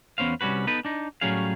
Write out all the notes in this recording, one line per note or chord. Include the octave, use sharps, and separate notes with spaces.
E2 B3 C#4 C5 F5
C2 G3 C#4 F#4 B4
B3 D#4 A4 B4
D4 D#4
A2 F#3 G3 C#4 G#4 F5